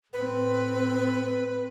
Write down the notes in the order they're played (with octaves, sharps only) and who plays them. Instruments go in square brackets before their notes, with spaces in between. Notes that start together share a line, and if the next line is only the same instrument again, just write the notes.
[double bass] A2 C4 [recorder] B4